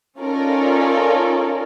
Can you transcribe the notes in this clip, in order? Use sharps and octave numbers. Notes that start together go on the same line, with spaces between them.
C#4 D#4 F4 A4 A#4 D5